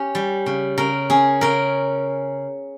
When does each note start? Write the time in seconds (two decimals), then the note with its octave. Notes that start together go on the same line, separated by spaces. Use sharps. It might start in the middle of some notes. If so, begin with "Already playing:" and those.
Already playing: C#4 G4
0.15 G3
0.46 C#3
0.78 C#3 A#4
1.10 C#4 G#4
1.41 C#3 A#4